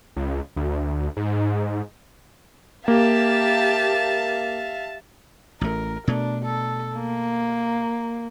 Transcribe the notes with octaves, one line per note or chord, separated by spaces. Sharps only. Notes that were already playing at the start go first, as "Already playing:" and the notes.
C#2
D2
G#2
A#3 G4 E5 F5 A5
A1 A3 A#4
B2 A3 D4
A4
A#3